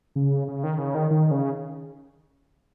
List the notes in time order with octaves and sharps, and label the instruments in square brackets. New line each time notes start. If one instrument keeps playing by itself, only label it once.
[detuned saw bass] C#3
C#3
D#3
C#3
D#3
D#3
C#3